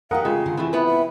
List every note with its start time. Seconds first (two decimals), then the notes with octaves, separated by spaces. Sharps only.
0.11 A3 D#4 G4 A#4 F5 F#5 D#6
0.25 C#3 G#3 F4
0.46 D3
0.57 C3 E3 A3 C4 E4
0.73 B3 B4 E5
0.86 E5